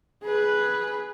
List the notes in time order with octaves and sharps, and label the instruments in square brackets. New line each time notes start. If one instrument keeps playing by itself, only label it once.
[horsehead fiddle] G#4 B4